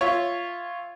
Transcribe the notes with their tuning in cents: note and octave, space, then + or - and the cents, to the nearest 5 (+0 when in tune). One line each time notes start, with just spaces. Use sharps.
F4 +0 C#5 +0 E5 +0